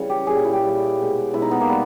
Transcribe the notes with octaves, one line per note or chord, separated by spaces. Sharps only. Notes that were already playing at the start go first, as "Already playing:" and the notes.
Already playing: C#3 E3 G3 C#5
G4
A#2 G3 G#4
G4
E4
G4
A#2 G3
B2 G#3
B2 G#3 E4
D#4
B3
A#3
G3 B3